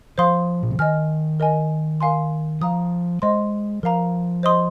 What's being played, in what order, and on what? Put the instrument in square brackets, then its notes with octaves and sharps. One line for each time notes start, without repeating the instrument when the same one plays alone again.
[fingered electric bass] F3 [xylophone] C5 F5 C6 D#6
[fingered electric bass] A#2
C3
[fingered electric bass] D#3 [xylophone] D#5 G#5 F6
[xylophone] A#4 D#5 G#5
A#4 F5 G#5 C6
[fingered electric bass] F3 [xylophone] F5 A#5 D#6
[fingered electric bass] G#3 [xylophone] C5 D#5 C6
[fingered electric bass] F3 [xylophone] A#4 F5 A#5
[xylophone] C5 D#5 C6 D#6